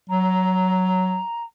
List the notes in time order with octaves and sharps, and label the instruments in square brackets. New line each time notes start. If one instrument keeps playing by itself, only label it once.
[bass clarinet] F#3 [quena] A#5